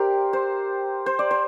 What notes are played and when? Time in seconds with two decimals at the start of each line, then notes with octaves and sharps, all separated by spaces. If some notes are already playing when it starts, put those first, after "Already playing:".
Already playing: G4 A#4 C5 D5
0.33 C5
1.06 C5
1.19 D5
1.31 C5